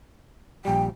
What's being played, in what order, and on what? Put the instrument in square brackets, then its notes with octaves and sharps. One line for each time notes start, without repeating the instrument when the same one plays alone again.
[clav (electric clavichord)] A#1 G3 [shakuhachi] G5